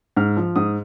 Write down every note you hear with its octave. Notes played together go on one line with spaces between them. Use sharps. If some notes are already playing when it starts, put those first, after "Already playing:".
G#2 F6
F3
G#2 D#6